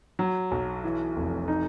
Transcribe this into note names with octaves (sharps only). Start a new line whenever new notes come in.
F#3
B1
E3
F1
D#4